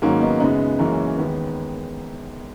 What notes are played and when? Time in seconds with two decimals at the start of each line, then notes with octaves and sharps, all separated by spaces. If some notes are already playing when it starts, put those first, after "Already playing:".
0.02 G#2 D#3 F#3 A#3 C#4
0.21 B3 D#4
0.40 F#2 C#3 G#3 B3 D#4
0.79 F#2 E3 G#3 A#3 C#4
1.18 D#2 D#3 G#3 B3